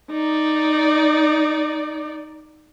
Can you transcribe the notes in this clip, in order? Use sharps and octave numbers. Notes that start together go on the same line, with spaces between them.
D#4 D5